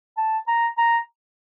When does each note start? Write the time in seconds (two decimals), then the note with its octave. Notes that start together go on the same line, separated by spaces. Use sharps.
0.17 A5
0.48 A#5
0.78 A#5